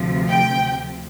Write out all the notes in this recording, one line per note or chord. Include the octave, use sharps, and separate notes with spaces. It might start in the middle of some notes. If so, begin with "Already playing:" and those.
Already playing: D2 C3 F3
G5